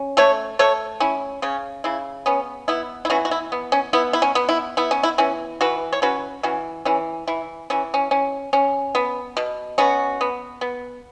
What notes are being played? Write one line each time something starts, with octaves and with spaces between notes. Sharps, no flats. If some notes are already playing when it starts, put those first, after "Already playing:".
Already playing: C#4
A3 A4 C#5
A3 A4 C#5
C#4 E4
C#3 C#4
C#3 E4
B3 C#4
B3 E4
E4
E3 C#4 F#4
F#4
E4
B3
C#4
B3 E4
E4
C#4
B3
E4
B3 E4
C#4
E4
E3 C#4
E3 F#4 B4
C#5
C#4 F#4 B4
E3 C#4 F#4
E3 C#4
E3 E4
E3 C#4
C#4
C#4
C#4
B3
B2
B3 C#4 F#4
B3
B3